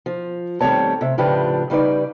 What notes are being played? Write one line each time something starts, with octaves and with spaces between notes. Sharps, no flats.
F3
D#3 G3 A3 C4 C#5 A5
C3 E5
A2 C#3 F3 D4 G4 B4
C#3 G3 D#4 B4 D5